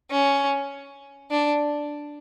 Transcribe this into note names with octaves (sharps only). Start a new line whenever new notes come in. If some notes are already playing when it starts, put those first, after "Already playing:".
C#4
D4